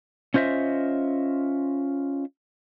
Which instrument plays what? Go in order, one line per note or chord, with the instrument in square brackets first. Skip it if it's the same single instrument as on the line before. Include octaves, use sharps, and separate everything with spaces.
[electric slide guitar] C#4 F4 C5 D#5 E5